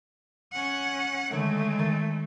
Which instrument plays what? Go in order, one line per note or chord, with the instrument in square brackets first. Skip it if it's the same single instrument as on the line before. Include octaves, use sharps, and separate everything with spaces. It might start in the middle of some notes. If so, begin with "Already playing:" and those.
[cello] C#4 F#5
[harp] D3 D#3 C#5 [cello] G#3 A3
[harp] D#3 A6